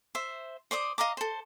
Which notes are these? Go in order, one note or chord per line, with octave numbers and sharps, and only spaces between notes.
C5 E5
C5 D5 D6 D#6
D#5 F5 A#5 D6
A4 C5